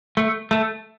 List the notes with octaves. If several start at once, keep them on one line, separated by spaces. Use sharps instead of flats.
A3
A3